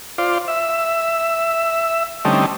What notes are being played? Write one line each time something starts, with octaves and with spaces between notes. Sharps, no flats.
F4 C5 D5
E5
D3 G3 A3 C4 C#4 D#4